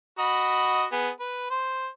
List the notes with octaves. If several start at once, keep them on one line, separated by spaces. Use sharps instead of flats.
F#4 D#5 B5
B3 G#4
B4
C5